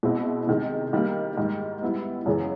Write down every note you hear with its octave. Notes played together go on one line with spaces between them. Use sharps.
B2 G#3 C4 E4
C3 D#3 G#3
D#3 G3 A#3
G#2 D#3 G3
G3 B3 E4
F#2 C#3 E3 G#3 C#4